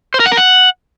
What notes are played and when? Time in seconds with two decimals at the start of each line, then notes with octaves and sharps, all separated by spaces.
0.14 C5
0.20 A#4
0.26 F#5
0.32 A#4
0.37 F#5